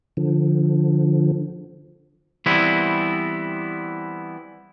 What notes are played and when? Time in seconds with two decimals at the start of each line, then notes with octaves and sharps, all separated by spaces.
0.17 D3 F3
2.46 E3 G3 B3 C4 E4